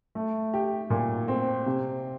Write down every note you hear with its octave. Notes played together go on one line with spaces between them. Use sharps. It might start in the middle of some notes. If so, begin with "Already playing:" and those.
A3
G4
A#2
C4
C3